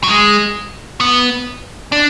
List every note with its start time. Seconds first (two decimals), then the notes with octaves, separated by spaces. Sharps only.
0.04 F#3
0.08 G#3
1.00 B3
1.92 D4